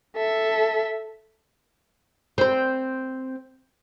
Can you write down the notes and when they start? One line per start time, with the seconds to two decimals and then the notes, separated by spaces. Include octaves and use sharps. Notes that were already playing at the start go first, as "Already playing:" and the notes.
0.17 A4 E5
2.38 C4 C5